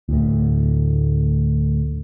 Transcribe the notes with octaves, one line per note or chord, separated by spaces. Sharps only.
D2 A2